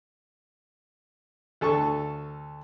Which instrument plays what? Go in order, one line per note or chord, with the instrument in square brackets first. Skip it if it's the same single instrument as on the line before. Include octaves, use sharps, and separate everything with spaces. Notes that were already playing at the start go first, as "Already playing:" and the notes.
[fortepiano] D2 A4 A5 C#6